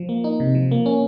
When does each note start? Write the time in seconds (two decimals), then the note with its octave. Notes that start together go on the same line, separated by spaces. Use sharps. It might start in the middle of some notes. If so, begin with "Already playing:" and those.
Already playing: F3
0.09 A#3
0.24 D#4
0.40 C3
0.55 F3
0.71 A#3
0.86 C#4